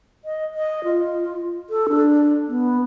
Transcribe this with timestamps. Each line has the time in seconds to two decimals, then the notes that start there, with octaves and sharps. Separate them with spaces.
0.25 D#5
0.55 D#5
0.84 F4
1.70 A4
1.89 D4
2.48 B3